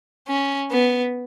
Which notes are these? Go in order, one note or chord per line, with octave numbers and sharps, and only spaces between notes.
C#4
B3